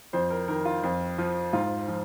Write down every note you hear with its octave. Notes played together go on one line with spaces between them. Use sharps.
F2 C5
A#4
D#3 A#4
F4
F2
F3
G#2 F4
F3